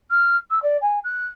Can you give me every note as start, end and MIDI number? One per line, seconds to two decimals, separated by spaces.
0.10 0.36 89
0.50 0.62 88
0.62 0.77 74
0.81 0.99 80
1.04 1.27 90